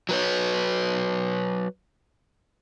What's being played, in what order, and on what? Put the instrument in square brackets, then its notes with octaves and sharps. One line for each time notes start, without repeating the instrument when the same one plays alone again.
[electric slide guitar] F#3 B4 C#5